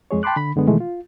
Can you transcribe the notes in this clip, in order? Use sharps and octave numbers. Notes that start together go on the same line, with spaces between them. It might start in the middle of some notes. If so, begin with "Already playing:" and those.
F2 G#3 G#4 C#5
G5 A5 B5 C6 D6 F#6
D3 B5
F#2 D3 G#3 B3
B2 D#3 E3 G#3 A3
F4